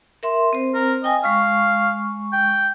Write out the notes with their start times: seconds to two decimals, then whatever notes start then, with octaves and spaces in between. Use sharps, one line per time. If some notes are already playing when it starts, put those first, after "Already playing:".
0.23 A#4 E5 C6
0.53 C4 C5
0.74 A#4
1.04 D#5 G5 G#5
1.24 G#3 F5 C#6
2.33 G5